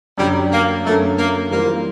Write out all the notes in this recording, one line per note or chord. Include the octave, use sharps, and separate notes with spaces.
F#2 D3 F#3 G3
A#3
F#2 D3 F#3 A3 A#3 C#4
A#3
E3 G3 A#3 C4 F4